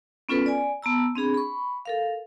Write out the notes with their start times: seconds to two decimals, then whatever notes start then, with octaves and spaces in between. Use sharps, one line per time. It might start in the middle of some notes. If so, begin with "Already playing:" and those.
0.29 B3 C#4 F4 A4 B4
0.46 D5 G#5
0.82 B3 A5 A#5 E6
1.15 C4 D4 G#4 B5
1.34 B5 C#6
1.85 A4 A#4 F5